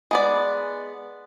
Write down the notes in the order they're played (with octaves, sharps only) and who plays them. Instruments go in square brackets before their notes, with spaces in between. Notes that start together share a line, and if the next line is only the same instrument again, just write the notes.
[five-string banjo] G#3 B3 D5